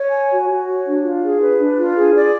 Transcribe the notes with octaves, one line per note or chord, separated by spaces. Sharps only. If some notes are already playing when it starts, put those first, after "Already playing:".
Already playing: C#5
G#5
F#4
F#4
C#5
D4
F4
G#4
B4
D4
F4
G#4
D5